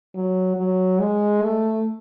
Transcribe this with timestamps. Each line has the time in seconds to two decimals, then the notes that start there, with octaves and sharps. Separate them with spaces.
0.15 F#3
0.57 F#3
1.00 G#3
1.41 A3